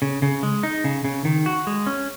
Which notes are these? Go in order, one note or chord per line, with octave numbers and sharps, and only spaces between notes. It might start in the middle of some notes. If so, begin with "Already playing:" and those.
C#3
C#3
G#3
D#4
C#3
C#3
D#3
F#4
G#3
C#4